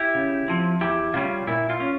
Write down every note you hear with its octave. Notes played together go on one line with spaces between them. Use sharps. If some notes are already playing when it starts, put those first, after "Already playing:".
Already playing: E4 G4
C#3
F3 C4
E2 E4 G4
C#3 G3 C#4 F4
A#2 E4
F4
C#4